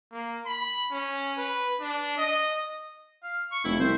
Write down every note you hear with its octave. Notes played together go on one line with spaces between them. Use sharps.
A#3
B5
C#4
B4
D4
D#5
F5
C#6
F1 E4
C2 C5